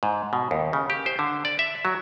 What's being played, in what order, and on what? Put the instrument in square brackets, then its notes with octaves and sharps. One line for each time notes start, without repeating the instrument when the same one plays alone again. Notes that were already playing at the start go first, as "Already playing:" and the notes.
[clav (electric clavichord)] G#2
B2
D#2
C#3
G4
C5
D3
D5
E5
F#3